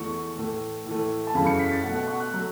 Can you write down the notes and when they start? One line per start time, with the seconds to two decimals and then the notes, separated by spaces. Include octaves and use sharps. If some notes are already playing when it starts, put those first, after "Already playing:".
Already playing: E2 E3 A3 C#6
0.38 A2 E3 A3
0.86 A2 E3 A3
1.27 A5
1.35 F#2 C#3 E3 A3 B5
1.47 C#7
1.59 B6
1.72 A6
1.83 B2 F#5
1.87 A3
1.95 F#5
2.08 C#6
2.20 F#6
2.34 F#3 A3